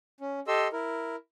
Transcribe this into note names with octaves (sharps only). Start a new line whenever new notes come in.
C#4
G4 A4 D#5 C6 E6
E4 A#4